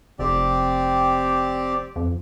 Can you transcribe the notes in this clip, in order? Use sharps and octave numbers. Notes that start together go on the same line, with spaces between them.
F1 C4 G4 D5
F2